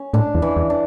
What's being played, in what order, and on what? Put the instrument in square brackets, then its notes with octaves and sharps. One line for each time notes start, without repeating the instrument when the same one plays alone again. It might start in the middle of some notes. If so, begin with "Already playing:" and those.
Already playing: [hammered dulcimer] C#4
[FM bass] A2 [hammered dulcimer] D4
[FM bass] E2
[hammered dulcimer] E3
[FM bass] E2
[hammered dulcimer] D4